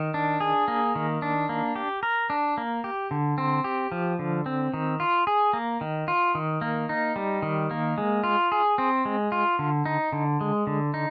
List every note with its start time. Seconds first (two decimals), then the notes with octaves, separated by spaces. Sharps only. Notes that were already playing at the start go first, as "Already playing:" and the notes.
Already playing: D#3
0.14 D4
0.40 G#4
0.68 A#3
0.96 D#3
1.22 D4
1.49 A#3
1.76 G4
2.03 A#4
2.30 D4
2.58 A#3
2.84 G4
3.11 D3
3.38 C4
3.64 G4
3.92 F3
4.19 D3
4.46 C4
4.74 D#3
5.00 F4
5.27 G#4
5.53 A#3
5.81 D#3
6.08 F4
6.35 D#3
6.61 A#3
6.89 D#4
7.16 G3
7.42 D#3
7.71 A#3
7.98 G#3
8.24 F4
8.52 G#4
8.78 C4
9.05 G#3
9.32 F4
9.59 D3
9.86 D#4
10.13 D3
10.41 G#3
10.67 D3
10.94 D#4